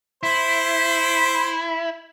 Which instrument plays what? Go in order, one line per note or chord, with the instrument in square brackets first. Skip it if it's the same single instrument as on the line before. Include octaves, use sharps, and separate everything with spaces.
[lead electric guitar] E4 [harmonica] C5